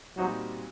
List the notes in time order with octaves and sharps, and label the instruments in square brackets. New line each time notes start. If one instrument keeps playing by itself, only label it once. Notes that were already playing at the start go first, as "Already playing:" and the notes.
[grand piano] A#2 G3 C4 D#4 F#4 [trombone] F#3